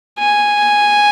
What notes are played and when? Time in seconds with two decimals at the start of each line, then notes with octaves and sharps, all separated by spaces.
0.19 G#5